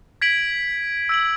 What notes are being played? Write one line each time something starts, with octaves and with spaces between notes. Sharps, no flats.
G#6 B6 D7 F#7
E6 G#6 D7 F#7